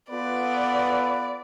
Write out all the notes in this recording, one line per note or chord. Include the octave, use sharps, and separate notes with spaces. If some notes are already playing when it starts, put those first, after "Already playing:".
B3 F4 A4 B4 D5